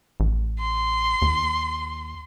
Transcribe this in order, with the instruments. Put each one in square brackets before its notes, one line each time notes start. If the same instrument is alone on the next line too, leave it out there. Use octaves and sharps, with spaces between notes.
[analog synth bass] A1
[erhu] C6
[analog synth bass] D#2